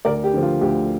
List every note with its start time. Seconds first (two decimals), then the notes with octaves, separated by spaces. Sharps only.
0.05 D2 A#4 D5
0.24 G4
0.33 D3 F3
0.42 F4
0.61 D2 G4